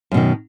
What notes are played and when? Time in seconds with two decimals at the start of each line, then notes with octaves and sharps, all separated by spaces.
0.12 F#2
0.14 B2
0.17 D#3